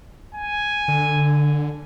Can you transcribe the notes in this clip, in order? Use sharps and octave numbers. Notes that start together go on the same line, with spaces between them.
G#5
D3